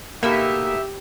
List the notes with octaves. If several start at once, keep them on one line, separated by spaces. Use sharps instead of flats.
B2 A3 A#3 D#4 G4 E5